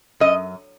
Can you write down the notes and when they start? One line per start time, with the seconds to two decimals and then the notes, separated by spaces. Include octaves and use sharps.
0.20 F#2 D#5